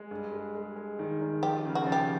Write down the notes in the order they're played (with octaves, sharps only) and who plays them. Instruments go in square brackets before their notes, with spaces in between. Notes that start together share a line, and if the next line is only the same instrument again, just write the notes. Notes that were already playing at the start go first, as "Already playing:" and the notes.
Already playing: [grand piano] G#3
G2
G#3
G#3
G#3
D#3
D#3
[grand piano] F3 [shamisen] G4
[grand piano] C#3
[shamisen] F#4
[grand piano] F3
[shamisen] G4